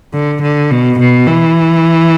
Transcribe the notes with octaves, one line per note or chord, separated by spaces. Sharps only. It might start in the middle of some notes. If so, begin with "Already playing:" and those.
D3
D3
B2
B2
E3